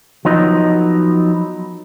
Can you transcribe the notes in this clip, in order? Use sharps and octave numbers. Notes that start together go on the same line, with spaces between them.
F3 F#3 B3 D#4